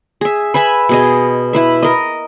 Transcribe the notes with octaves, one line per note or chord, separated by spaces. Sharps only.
G#4 E5
B4 E5 G#5 B5
B2 G#4 D#5
E4 B4 E5
A#4 D#5